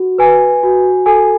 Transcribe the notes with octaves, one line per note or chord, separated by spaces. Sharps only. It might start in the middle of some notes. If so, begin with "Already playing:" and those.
Already playing: F#4
B4 G#5
F#4
A4 G#5